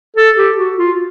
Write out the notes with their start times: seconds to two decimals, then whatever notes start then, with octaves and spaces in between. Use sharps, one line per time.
0.16 A4
0.37 G4
0.57 F#4
0.77 F4